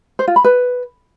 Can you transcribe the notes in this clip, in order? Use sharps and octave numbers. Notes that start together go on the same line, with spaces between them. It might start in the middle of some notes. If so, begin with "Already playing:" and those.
C5
F4
B5
B4